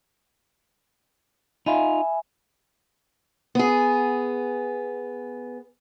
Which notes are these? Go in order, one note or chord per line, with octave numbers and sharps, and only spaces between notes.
D#4 F4 E5 G#5 B5
B3 G#4